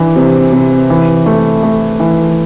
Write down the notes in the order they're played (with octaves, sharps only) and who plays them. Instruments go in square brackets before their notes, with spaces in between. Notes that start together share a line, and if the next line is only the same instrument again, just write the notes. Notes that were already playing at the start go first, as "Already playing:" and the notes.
Already playing: [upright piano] E3 D4
C3
C3
E3
A3
A3
E3